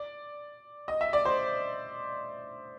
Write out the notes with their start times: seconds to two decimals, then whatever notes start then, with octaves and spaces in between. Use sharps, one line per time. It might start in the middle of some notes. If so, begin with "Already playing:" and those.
Already playing: D5
0.88 D#5
1.01 E5
1.13 D5
1.25 C5